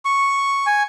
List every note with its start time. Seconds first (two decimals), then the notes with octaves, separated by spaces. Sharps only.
0.05 C#6
0.67 G#5